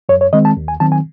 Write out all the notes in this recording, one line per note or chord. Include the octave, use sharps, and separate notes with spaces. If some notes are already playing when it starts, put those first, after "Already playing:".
F#2 C#5
C#5
D#3 G#3 C4 D#5
A5
D#2
G#5
D#3 F#3 C4 A5
G#5